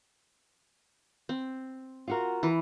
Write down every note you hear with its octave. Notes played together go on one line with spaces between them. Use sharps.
C4
F4 F#4 A#4
E3